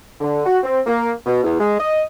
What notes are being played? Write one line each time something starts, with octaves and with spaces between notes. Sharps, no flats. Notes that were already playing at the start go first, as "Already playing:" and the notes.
D3
F#4
C4
A#3
B2
E2
G#3
D#5